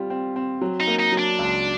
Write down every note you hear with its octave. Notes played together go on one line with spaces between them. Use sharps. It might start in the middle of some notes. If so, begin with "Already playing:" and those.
Already playing: G3 C4 F4
C4
C4
F#3
D#4
A#3
D#4
F#3
D4
C#2